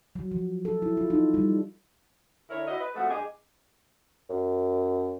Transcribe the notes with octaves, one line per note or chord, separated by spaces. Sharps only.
F#3
F3
A4
E4
F4
D#4
G3
D3 E4 A#4 C#5
E4 F#4 D#5
B4
F3 G#3 A3 C4 F#4
G2 A#3 G4 G#4 D#5
F#2